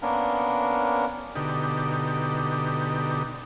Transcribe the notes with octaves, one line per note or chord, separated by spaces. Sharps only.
A#3 B3 C#4 D4 A#4
B2 D3 D#4 G4